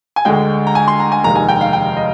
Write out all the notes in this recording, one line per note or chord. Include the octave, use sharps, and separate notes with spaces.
G#5
D2 D3 G#3 G5
A#5
G#5
C6
A#5
G#5
F1 D#2 D#3 G#3 A#5
G#5
G5
F5
G5
D#5